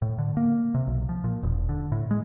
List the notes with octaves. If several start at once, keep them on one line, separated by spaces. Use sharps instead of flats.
A2
D3
A#3
C3
B1
F3
A#2
E1
D3
A2
G#3